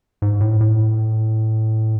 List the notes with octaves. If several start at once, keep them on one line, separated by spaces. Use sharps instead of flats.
G#2
A2
A2